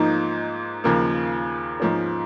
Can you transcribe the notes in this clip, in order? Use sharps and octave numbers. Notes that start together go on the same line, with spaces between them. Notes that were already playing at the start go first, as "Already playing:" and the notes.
Already playing: G#2 F3 A#3 D#4
D#2 C#3 F3 A#3
G#2 F3 A#3 C#4